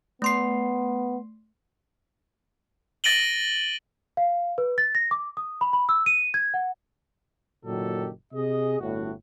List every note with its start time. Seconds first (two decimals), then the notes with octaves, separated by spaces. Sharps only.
0.22 A3 B3 C6 C7
3.04 A6 A#6 D7 D#7 F#7 G7
4.17 F5
4.58 B4
4.78 A6
4.95 A#6
5.11 D6
5.37 D#6
5.61 B5
5.73 B5
5.89 E6
6.06 D#7
6.34 G#6
6.54 F#5
7.65 F#1 A#2 D#3 F#3 G4 A4
8.33 C3 G#4 D#5
8.80 G1 A2 F#4